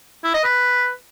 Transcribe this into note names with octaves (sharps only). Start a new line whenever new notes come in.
E4
D#5
B4